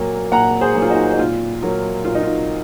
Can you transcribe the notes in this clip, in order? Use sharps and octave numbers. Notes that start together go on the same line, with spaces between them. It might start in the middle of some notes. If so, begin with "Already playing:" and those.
Already playing: A#2 F#3 A#3
A#2 F#5 A#5
G#4 C5
F#3 A#3
F4
D#4 F#4
D#4
A#2 F4
F#3 A#3
A#2 F4
D#4
F4